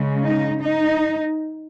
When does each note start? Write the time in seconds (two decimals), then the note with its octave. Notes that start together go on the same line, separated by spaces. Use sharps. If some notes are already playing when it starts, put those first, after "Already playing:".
Already playing: C#3 G#3
0.24 D#4
0.63 D#4